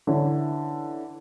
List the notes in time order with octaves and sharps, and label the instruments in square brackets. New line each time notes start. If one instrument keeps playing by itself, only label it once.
[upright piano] D3 E3 C#4